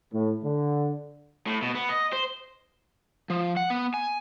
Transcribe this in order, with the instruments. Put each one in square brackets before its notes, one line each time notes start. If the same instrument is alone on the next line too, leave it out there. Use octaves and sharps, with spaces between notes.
[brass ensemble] A2
D3
[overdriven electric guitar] A2
B2
B3
D#5
C5
[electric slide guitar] F3
F#5
B3
G#5